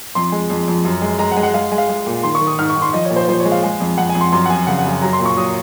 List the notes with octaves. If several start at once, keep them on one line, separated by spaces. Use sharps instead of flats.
F2 C6
G#3
F2
F2
F#2
G#3
G#3 A#5
F#5
G#3
F#5
G#3 F5
G#3
F5
G#3
A#2
D#3 C6
C#6
D#3
D#6
G#2 F6
C#6
G#2
C6
F3 D#5
C#5
A#2
C5
F3 C5
C#5
G#3
F5
G#3
F2
F2 F#5
G#5
F2
C6
F#2 C6
F#5
F#2 G#5
C#3 F#5
F#5
F#2
G#5
F#3 A#5
C6
A#2
C#6
F#3 D#6